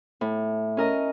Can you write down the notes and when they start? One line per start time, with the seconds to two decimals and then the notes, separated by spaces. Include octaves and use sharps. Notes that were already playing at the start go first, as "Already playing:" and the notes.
0.21 A2
0.77 C#4 A#4 D#5